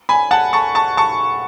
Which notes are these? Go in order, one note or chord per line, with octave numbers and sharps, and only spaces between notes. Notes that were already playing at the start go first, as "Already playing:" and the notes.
G#5 B5
F#5 A5
A5 C#6
A5 C#6
A5 C#6